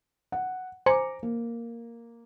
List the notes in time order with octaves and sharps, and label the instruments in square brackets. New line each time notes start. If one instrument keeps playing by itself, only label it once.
[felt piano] F#5
[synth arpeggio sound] C5 G#5 C#7 [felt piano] A#5 D6
[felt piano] A#3